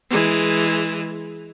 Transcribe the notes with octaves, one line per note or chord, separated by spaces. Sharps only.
E3 G#3